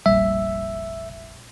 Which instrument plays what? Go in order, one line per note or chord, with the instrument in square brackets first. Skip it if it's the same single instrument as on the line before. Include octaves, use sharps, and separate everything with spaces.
[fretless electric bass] F1 A#1 G3 [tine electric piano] E5